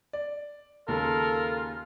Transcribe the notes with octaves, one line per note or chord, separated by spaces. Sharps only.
D5
D#2 C#3 G#3 F4 A4 A#4